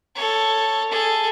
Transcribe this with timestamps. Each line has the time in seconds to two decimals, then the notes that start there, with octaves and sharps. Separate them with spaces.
0.15 A4 C#5
0.91 G#4 A4